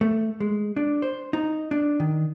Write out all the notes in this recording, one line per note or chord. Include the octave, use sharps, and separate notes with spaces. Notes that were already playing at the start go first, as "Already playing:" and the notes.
A3
G#3
D4
C5
D#4
D4
D#3